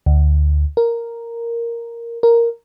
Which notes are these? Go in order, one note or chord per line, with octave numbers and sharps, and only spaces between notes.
D2
A#4
A#4